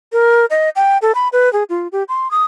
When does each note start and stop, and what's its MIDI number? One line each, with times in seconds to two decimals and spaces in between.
0.13 0.46 70
0.50 0.70 75
0.76 0.98 79
1.02 1.12 69
1.15 1.29 83
1.33 1.52 71
1.53 1.64 68
1.70 1.88 65
1.92 2.03 67
2.08 2.30 84
2.31 2.44 87